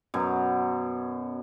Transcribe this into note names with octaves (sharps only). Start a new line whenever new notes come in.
F#2 B2